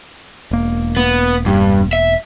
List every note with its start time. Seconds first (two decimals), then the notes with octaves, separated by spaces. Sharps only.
0.51 E1 A#3
0.97 B3
1.46 G2
1.93 E5